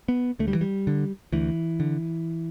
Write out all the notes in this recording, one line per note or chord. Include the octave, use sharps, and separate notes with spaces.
B3
D2 A3
G3
E3
G3
D3
D2 E3
D3